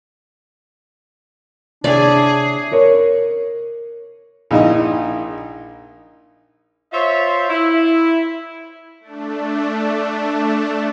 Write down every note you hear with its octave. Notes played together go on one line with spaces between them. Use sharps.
C3 D4 G#4 C#5 D5 E5
A#4 C#5
A#1 D#4 E4 D#5
F4 C5 C#5 E5
E4
A3 D4